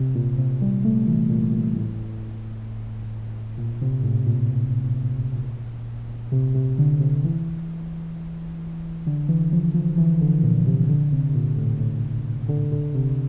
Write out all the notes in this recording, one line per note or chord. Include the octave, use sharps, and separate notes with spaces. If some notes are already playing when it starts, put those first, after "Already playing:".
Already playing: C3
A#2
C3
G3
A3
E3
A#2
A#2
A2
A#2
C3
A2
A#2
C3
C3
D3
C3
E3
D3
E3
F3
F3
E3
D3
A#2
C3
D3
C3
A#2
A2
A2
D3
D3
C3